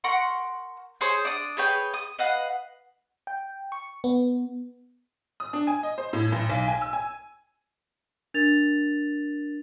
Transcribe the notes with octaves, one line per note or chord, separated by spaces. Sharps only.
A#4 F#5 C6 C#6
G#4 C5 C#5
D4 D#6
G#4 B4 C#5 G5
D#6
B4 D#5 F5 F#5
G5
C#6
B3
D#6
D4
G#5
D#5
C5
A2
A1
B1
G#5
E6
G#5
D4 A#4 A6 F7